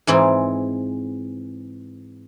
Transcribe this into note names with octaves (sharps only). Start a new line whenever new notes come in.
G#2 E3 C4 G#4